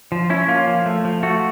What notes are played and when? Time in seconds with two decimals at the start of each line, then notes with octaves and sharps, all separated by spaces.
0.12 F3
0.30 C#4 E4
0.48 A#3 F4
0.67 F3
0.86 A3
1.05 F3
1.23 A3 F#4